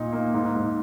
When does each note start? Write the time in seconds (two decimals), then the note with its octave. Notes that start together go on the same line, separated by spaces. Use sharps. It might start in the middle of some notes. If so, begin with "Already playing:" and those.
Already playing: A#2 D#4
0.12 A#3
0.34 G#2
0.55 G#2